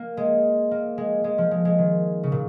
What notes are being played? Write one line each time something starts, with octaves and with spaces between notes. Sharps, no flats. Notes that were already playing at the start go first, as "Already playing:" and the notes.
Already playing: A#3
G#3
A#3
G#3
G#3
F3
G#3
G#3
D#3
C#3
A#2